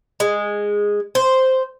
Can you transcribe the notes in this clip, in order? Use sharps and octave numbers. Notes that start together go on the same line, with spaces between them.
G#3
C5